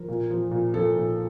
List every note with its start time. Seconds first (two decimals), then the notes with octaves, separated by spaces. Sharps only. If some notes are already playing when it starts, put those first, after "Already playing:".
Already playing: F3 A#4
0.08 A#2
0.30 F3
0.51 A#2
0.74 F3 A4
0.95 A#2